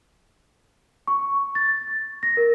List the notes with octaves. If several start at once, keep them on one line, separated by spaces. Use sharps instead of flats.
C#6
A6
A6
A#6
A#4